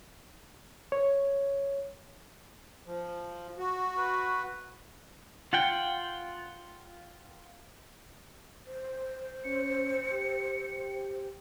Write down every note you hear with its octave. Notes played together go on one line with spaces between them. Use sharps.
C#5
F3
F#4
B4
F4 F#5 G5
C5
C#4 C#7
G4